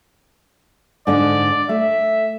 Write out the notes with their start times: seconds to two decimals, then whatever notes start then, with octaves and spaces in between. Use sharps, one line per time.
1.07 G#2 D3 D4 D5
1.69 A3 E5